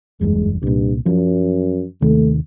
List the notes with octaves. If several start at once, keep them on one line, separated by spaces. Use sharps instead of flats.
F#1 E2 G2 G#3
C2 G2 A#2
F#2 F3 F#3
D#2 C3 D#3 A3